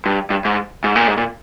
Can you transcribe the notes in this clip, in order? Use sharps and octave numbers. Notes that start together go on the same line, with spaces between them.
G2
G2
G#2
G#2
A#2
G#2
A#2